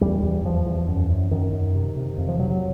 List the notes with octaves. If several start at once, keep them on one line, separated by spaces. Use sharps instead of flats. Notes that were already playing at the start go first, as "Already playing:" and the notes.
E2 G3
E2
E2 F3
E2
F#2
F#2
F#2 D#3
F#2
C3
C3
F2
F3
C3 F#3
F#3